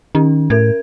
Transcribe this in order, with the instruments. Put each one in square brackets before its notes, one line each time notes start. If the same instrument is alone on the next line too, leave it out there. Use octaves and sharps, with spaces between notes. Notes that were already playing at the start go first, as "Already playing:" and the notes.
[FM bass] D#3 [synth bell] C#4
[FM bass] A2 [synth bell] A#4 G#6